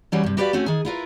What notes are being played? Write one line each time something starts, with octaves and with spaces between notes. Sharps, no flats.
E3 F#3 G3 C#4
G2 C3
F#4 G4 B4 C#5 D5 F5
A3 C4 C#4 F#4
D#3 G#4
E4 F4 A#4 B4